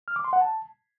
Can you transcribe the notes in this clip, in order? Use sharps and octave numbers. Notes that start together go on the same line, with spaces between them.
F6
D6
C6
F#5
A5